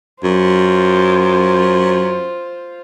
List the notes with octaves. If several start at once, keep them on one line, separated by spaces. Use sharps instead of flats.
F#2 F4 C5